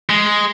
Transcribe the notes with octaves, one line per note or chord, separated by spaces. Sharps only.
G#3